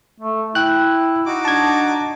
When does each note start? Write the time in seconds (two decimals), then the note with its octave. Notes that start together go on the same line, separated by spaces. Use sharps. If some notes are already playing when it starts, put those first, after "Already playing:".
0.20 A3
0.55 E4 G5 F#6
1.26 D#4 F#4 D6
1.45 D4 A5 G#6